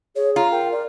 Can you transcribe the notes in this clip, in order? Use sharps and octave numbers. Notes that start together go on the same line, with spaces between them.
G#4 C#5
F4 A#5
A#4 G5
D5